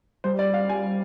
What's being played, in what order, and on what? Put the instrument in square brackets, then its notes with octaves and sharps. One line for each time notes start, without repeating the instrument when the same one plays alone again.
[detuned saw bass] G3 [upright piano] C5
[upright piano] D5
F5
G#5